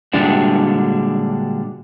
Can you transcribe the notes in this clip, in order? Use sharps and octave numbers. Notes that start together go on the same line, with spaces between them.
A#2 D3 G3 G#3 D4 F#4